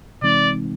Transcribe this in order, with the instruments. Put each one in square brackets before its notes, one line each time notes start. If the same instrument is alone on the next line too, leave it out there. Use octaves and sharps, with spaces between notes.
[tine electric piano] C3 E3 G#3 C4 D#4 [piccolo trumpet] D5